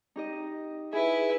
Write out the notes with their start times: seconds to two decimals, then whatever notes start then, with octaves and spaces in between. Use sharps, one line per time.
0.16 D#4 G4 D#5
0.93 E4 G#4 B4